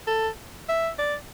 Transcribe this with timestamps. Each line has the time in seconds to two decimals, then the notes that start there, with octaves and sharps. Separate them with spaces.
0.07 A4
0.69 E5
0.99 D5